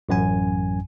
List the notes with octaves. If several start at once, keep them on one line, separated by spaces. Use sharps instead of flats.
A1 F#2 G#5